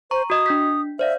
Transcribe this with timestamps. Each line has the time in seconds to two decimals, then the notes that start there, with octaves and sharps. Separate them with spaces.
0.11 C5 A#5 C#6
0.30 F#4 D#5 D#6
0.46 D4 G6 B6
0.99 C5 D5 E5 F5